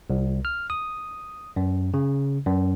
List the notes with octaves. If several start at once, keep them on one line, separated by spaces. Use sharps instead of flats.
C2
F6
D#6
F#2
C#3
F#2